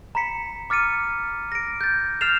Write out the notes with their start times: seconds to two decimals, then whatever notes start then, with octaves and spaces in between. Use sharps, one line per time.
0.15 A#5 B5 B6 C#7
0.70 D6 F6 A6 C#7 D#7
1.52 A#6 D7
1.81 G6 A6
2.21 F6 G6 A6 C7 E7 F7